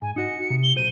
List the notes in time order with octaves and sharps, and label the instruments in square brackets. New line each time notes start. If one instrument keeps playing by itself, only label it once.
[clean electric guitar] G#2 [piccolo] G#5
[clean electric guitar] D#4 F#4 D#5 [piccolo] C#7
[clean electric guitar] C3
[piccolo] G7
[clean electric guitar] B1 C5 [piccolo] D#7